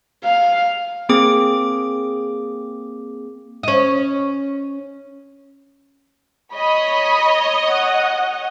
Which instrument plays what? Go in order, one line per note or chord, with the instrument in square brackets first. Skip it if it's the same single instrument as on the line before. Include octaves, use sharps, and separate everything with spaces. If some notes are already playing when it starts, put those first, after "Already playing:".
[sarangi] F5
[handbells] A#3 C4 G#4 D6
[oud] C#4 D#5
[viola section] C#5 D#5 [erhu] B5
[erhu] F#5